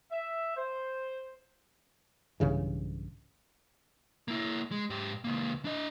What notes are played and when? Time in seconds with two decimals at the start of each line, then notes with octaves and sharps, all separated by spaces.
0.11 E5
0.56 C5
2.40 B1 G2 C#3 E3
4.28 A#3 E4
4.71 G#3
4.90 G#2 G4
5.24 C#2 A#3
5.65 D4 D#5